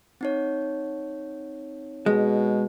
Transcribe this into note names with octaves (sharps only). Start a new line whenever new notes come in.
C4 D#4 C#5
B2 G#3